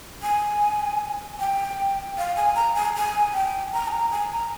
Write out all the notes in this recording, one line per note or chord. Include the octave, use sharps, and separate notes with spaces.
G#5
G5
F5
G#5
A#5
G#5
G#5
G5
A#5
G#5
A#5
G#5
A#5